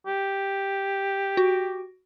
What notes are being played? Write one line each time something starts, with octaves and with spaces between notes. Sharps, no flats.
G4
F#4